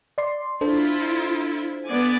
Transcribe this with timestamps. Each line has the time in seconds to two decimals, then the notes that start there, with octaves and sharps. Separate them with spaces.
0.18 D5 C6
0.61 D4 E4 F4 A4 C5
1.86 B3 D5 G#5